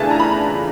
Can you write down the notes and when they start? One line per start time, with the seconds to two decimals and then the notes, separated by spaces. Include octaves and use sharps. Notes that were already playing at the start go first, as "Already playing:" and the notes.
Already playing: C#3 E3 A3 D4 F4 G#5 A5
0.11 A#5
0.20 B5